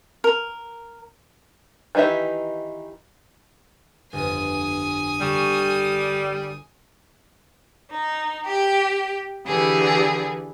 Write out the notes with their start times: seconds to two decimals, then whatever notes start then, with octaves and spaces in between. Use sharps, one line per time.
0.24 A#4
1.95 D#3 E3 D#4 G4 E5
4.13 G1 F2 G#5 D#6
5.21 D3 G3 C#6 E7
7.90 D#4
8.45 G4 G5
9.46 D3 E3 G4 G#4 B4